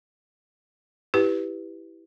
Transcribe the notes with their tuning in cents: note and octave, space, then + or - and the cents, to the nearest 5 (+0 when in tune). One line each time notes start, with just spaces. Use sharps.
E4 +0 G4 +0 B4 +0